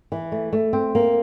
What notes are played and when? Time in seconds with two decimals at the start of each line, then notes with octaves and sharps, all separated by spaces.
0.12 E3
0.32 A3
0.53 A3
0.73 C4
0.95 A#3